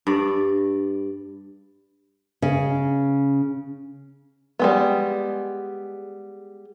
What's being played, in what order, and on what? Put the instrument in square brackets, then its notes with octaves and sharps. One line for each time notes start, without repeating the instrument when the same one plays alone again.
[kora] G2 D5
[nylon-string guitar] C#3
[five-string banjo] G3 G#3 B3